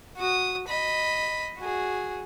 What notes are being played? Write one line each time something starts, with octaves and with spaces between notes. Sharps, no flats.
F#4 D#6
D#5 B5
F#4 G#4